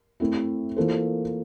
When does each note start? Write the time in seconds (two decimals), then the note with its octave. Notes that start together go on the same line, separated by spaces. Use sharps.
0.20 A3 C4 E4
0.76 E3 A#3 F4 A4 C5